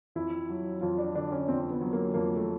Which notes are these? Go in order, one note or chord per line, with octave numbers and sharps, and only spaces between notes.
F2 E4
F#3
F2 F4
D4
D3 D4
C#4
F2 C4
B3
F#3
A#3
F2 A#3
A3